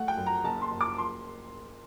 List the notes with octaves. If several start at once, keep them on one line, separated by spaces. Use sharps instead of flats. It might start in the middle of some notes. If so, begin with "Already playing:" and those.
Already playing: A3 F#5
G5
F#2
A#5
F#1 A5
C6
F#1
D6
C6